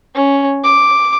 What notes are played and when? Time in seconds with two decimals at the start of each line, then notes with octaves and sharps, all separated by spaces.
0.15 C#4
0.64 D6